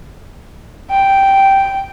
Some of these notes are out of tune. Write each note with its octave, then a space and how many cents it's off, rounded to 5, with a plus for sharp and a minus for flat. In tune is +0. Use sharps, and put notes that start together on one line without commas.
G5 -5